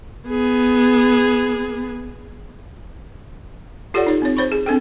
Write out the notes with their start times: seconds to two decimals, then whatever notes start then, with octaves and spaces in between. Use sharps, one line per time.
0.28 B3 G#4
3.94 F4 G4 A4 C#5 D5 F#5
4.07 D#4 C#5
4.22 C4 D#4 C#5
4.37 C5 C#5 B5 C#6
4.52 G#4
4.66 C4 D4 A4 G5